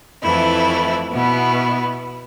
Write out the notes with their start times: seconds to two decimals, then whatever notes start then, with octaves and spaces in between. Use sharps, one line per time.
0.23 F2 E3 A3 E4
1.11 B2 B3 E4